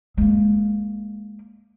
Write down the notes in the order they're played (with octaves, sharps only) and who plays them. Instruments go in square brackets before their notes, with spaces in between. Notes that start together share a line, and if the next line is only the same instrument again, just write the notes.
[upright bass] G#3 A#3